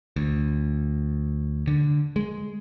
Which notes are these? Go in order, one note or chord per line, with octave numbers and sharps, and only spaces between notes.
D2
D3
G#3